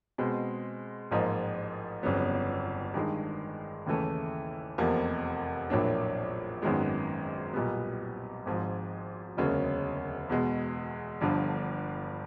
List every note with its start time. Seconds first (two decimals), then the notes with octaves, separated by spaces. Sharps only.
0.18 B2 G#3 C4
1.11 A1 G#2 F3 A#3 D#4
2.03 G1 F2 C#3 F#3 B3
2.94 G2 D#3 G#3
3.86 D#2 C#3 E3 A3
4.78 F1 E2 C3 F3 A#3
5.70 A#1 A2 F#3 A#3 D4
6.62 G#1 F#2 D#3 G#3 B3
7.53 B1 A#2 G3 B3
8.46 G#1 G#2 F3
9.37 E1 D2 C#3 F#3 A#3
10.29 E2 B2 G#3
11.21 G1 G2 D3 F3